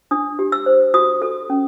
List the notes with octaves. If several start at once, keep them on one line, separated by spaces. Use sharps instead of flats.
D4 D#6
G4
E6
C5
F#4 D#6
A4
C#4